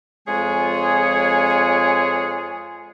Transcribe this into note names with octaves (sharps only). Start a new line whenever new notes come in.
F2 G#3 F4 G#4 C#5 G#5